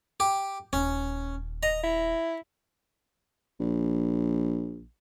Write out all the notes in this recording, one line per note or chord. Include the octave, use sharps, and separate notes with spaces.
G4
D#1 C#4
D#5 A#5
E4
A#1